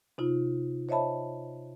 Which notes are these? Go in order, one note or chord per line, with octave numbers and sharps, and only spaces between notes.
C3 D#4 F4
C5 C#5 D#5 E5 A5 B5